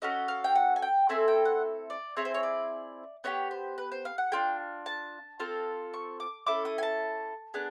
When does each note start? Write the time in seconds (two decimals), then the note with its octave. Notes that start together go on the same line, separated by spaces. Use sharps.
0.02 C#4 F#4 A4 D#5
0.28 F5
0.44 G5
0.55 F#5
0.76 G#5
0.82 G5
1.09 A3 C4 E4 A4 G#5
1.28 G5
1.45 F#5
1.90 D5
2.17 C4 E4 G#4 C#5
2.25 C5
2.34 C#5
2.43 D5
3.24 B3 D#4 G4 C#5
3.51 C5
3.78 B4
3.92 C5
4.05 F5
4.18 F#5
4.32 D4 F4 G#4 G5
4.86 A5
5.39 C4 F4 A4
5.94 C#6
6.20 D6
6.47 C#4 E4 A4 D6
6.65 D#6
6.78 G#5
6.83 A5
7.54 B3 D4 G#4